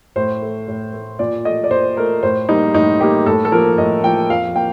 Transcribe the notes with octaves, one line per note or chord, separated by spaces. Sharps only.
A2 C5
A3
A2
A3
A#2 D5
A3 D#5
D5
A#2 C5
A3 A#4
A2 C5
G3 A#3 D#4
A2 D#4
G3 A#3 G4
A2 A4
A4
F3 A#3 A#4
A2 D#5
F3 A#3 G5
F2 F5
A#3 G5